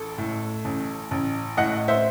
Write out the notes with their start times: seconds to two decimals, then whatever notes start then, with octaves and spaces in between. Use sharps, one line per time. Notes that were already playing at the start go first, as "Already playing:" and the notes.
Already playing: A1 A4
0.18 A2
0.65 A1
1.11 A1
1.57 A2 D#5 F#5
1.88 C5 E5